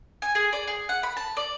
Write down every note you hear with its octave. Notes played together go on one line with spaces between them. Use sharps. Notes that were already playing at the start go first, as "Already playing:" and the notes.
G#5
G#4
D5
G#4
F#5
B5
A5
D5